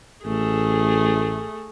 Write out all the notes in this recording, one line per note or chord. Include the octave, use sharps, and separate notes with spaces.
A1 A3 G#4